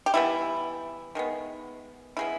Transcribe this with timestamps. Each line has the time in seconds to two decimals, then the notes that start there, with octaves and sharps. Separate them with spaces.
0.06 G4
0.14 E3 G3 B3 E4
1.15 D#3 G#3 B3
2.17 C#3 G#3 B3 E4